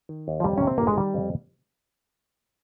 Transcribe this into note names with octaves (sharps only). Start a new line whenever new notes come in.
D#3
D#2
F3
F2 G3
C3 C#4
C4
G1 A#3
G#3
D#3 G3
F2